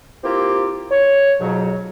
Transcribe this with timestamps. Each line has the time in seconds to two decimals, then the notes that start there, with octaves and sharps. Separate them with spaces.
0.24 A#3 C4 E4 F4 G4
0.91 C#5
1.40 F2 G#2 B2 F#3